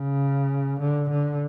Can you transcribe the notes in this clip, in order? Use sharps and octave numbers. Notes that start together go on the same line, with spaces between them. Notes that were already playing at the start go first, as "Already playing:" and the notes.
Already playing: C#3
D3
D3